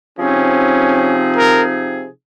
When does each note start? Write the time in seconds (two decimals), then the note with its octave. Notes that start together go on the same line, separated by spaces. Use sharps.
0.19 C3 F3 C4 C#4 D#4 G#4
1.37 A#4